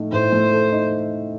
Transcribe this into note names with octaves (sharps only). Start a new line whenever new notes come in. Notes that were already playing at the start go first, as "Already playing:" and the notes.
Already playing: A2 A3 D#4 A4
A2 C5
A3
A4
D#4